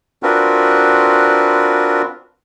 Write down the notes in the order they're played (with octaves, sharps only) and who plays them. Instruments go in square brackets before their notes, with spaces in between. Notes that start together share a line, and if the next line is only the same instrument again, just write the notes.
[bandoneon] C4 D4 F4 F#4 A#4 B4